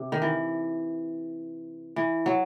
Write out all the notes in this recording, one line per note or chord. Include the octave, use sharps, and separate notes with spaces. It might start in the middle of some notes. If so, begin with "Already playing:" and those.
Already playing: C3
D#3
E3
E3
F#3